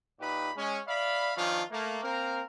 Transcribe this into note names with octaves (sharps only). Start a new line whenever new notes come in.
A#2 D#4 G4 B4 B5
G#3 C#4
D5 E5 F5 B5
D#3 F3 C#4 D4 F4
A3 A#3
A#3 C4 A#4